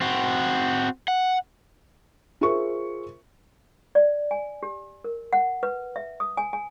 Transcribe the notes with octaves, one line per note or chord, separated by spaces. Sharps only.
C4 F#4
F#5
F4 G#4 A#4 C5 E5 C#6
D5
G#5
G4
A#4
F#5
B4
E5
D#6
G#5
G#5